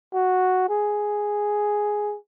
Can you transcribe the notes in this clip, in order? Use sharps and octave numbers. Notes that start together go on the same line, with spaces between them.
F#4
G#4